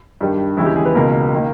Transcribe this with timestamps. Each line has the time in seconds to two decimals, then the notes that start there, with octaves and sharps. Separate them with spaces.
0.21 G2 D#3 G3
0.57 D#2 C#3 E3 G#3 E4
0.66 G4
0.76 G#4
0.86 B4
0.95 C#2 B2 A#3 A#4
1.34 D#3 A#3